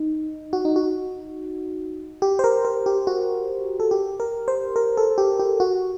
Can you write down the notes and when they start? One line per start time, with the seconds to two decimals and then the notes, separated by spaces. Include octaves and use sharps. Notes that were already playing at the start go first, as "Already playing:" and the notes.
Already playing: D#4
0.53 F#4
0.65 D#4
0.76 F#4
2.22 G4
2.39 C5
2.44 A#4
2.65 A#4
2.86 G4
3.07 F#4
3.80 A4
3.91 G4
4.20 A#4
4.48 C5
4.76 A#4
4.97 A4
5.18 G4
5.39 G4
5.60 F#4